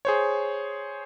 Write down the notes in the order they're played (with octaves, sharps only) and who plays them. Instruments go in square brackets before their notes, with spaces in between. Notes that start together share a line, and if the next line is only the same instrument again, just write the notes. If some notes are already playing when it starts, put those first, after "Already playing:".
[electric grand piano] G#4 C5 C#5